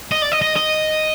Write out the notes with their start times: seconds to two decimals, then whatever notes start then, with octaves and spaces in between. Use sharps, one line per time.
0.12 D#5
0.22 D5
0.32 D#5
0.42 D#5
0.56 D#5